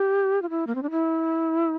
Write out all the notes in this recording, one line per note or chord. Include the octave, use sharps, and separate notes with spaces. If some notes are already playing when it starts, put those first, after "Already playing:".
Already playing: G4
F4
E4
A#3
C4
D4
E4